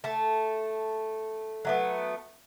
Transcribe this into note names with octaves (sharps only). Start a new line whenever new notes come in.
A3 A5
F#3 A3 B3